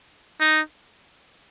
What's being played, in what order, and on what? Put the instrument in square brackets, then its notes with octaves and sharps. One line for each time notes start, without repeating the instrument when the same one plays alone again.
[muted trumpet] D#4